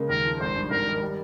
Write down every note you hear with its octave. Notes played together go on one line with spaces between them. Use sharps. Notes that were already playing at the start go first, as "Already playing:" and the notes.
Already playing: C#3 G#3 A#3
D#2 A#4
F3
G#1 C5
G2
G#1 A#4
D#3
G3